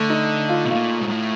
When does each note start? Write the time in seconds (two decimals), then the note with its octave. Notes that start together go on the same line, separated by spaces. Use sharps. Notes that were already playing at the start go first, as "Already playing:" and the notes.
Already playing: D3 A3
0.10 D#4
0.49 F4
0.65 B2
0.70 A#2 F4
1.00 G#2
1.10 A2